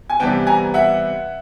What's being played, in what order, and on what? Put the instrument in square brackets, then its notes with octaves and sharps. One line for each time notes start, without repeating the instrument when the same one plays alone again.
[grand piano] G#5
C3 E3 G3 B3 G5 A5
G#5 A#5
E5 F#5